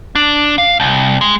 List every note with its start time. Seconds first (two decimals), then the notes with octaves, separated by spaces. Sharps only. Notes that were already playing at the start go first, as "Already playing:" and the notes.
0.15 D4
0.58 F5
0.80 C2
1.21 G#3